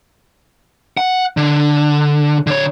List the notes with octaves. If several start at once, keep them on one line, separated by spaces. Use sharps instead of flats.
F#5
D3
D3 C#5